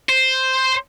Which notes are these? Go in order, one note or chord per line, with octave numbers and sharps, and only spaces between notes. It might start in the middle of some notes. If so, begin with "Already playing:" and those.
C5